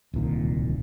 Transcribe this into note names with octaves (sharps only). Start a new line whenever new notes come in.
D1 C2 A#2 D#3